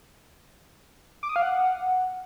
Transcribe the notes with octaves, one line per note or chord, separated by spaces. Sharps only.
D6
D#6
F5
F#5